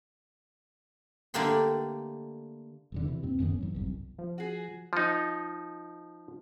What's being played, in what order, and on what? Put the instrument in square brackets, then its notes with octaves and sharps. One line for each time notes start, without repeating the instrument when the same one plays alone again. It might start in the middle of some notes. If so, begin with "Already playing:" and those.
[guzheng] D3 A3 A#3 G4 F#5 C6
[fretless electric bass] E1 E2 D3
C3 E3
D#2 G#2 C4
D1 F#2 D#3 B3
G#2 E3 F#3
G1 C2 F#2
[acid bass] F3
[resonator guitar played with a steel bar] F#4 G#4
[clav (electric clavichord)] F3 D#4